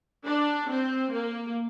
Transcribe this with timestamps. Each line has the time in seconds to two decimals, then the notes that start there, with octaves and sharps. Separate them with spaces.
0.26 D4
0.70 C4
1.13 A#3